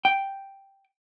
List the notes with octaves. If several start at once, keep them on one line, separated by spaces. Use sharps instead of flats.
G5